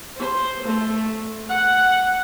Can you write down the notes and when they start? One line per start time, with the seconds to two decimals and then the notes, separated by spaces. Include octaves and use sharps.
0.17 C5
0.65 A3
1.50 F#5